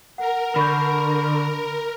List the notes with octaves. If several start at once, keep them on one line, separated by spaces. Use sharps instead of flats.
A#4 F#5
D3 B5 C#6 G6